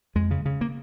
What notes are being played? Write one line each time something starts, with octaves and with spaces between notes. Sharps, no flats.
F2 G#3
C#3
C#3
A#3